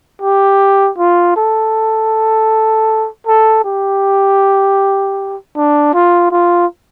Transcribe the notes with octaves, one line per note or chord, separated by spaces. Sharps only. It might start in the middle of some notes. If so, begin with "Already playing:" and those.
G4
F4
A4
A4
G4
D4
F4
F4